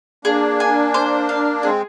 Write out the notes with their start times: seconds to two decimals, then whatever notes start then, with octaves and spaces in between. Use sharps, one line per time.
0.25 A#3 D4 G#4
0.60 G#5
0.94 C5
1.29 F5
1.63 G#3 C4 G#4